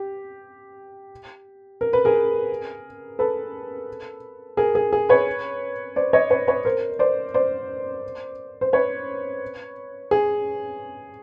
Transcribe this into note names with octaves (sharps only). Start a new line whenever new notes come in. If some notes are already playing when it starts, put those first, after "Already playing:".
Already playing: G4
A#4
B4
G#4 A#4
A4 B4
G#4 A#4
G#4
G#4
B4 C#5
C5 D5
C#5 D#5
B4 C#5
B4 C#5
A#4 C5
C5 D5
C5 D5
C5
B4 C#5
G#4